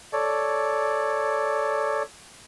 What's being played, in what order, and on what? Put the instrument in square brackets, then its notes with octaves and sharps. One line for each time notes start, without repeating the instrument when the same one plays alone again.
[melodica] A4 C#5 D5